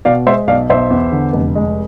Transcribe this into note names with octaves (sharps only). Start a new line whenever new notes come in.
B2 D5 F5
G#3 C5 E5
B1 D5 F5
B1 C5 E5
E2
D3
F1
G#3